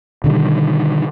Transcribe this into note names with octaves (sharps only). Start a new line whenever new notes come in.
B2 D3 D#3 G3